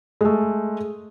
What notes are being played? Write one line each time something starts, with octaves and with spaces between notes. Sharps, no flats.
G#3 A3